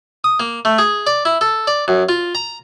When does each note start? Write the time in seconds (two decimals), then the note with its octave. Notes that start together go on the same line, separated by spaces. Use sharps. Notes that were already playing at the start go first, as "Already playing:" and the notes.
0.24 D#6
0.40 A#3
0.65 A3
0.78 G#4
1.07 D5
1.25 E4
1.41 A4
1.67 D5
1.88 F#2
2.09 F4
2.35 A#5